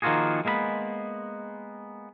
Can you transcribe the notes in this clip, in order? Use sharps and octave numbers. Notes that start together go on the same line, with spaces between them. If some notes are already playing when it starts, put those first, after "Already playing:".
D#3 F3 A#3 F4 F#4 G#4
G#3 A#3 B3 E5 B5